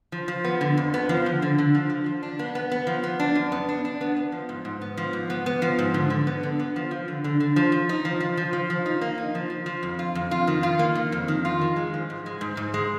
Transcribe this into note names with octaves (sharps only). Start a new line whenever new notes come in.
F3
F3
B3
D3
F2
B3
F3
D3
D3
D3
F3
F3
F3
D4
B3
B3
B3
F3
B3
D4
F#2
B3
D4
D4
B3
B3
F3
G#2
G#2
B3
F3
G#2
B3
B3
F3
G#2
D3
D3
B3
D3
B3
F3
F3
D3
D3
D3
F3
F3
D#4
F3
F3
F3
F3
F3
D#4
A#3
D#4
F3
F3
F3
F2
F4
F2
F4
D#3
F4
A#3
D#3
F2
D#3
F4
D#3
G#3
F3
G#2
G#3
G#2
G#2
G#3